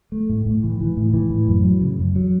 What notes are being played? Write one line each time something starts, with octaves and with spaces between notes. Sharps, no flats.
A3
A2
A2
E3
E3
A2
E3
A2
F#2
F#3
C#3
F#2
F#3